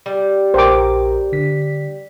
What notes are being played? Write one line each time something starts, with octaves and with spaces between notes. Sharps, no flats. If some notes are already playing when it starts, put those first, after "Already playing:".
G3
A#1 A#4 C5 G5 A#5 D6
D3 B6